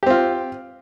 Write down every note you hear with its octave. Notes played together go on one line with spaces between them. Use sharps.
C4 F4 G4